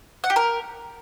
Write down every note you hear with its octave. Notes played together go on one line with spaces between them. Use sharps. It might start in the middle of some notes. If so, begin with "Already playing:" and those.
F#5
G4
A#4